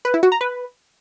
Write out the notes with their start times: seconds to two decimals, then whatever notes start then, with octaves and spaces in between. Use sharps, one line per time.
0.05 B4
0.14 E4
0.23 F#4
0.32 A#5
0.41 B4